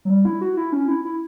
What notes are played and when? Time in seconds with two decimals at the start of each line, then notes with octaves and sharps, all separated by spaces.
0.05 F#3
0.10 G3
0.25 E4
0.41 F#4
0.57 E4
0.73 C#4
0.88 E4
1.05 E4